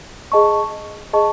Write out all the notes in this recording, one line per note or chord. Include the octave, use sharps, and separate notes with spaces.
G#4 D#5 A5 C#6
G#4 D#5 A5 C#6